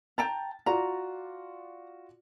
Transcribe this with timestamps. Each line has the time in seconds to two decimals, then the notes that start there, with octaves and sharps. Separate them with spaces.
0.18 G5 A5 A#5 A6
0.66 F4 F#4 D5 A#5